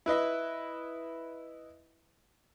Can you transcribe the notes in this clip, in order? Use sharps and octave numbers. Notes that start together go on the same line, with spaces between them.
E4 B4 D#5 E5